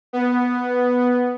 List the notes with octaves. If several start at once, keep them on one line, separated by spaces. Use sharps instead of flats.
B3